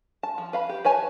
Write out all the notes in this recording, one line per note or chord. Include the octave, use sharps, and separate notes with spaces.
A5
F3
B4 F5 B5
G4
B4 C#5 G#5 A5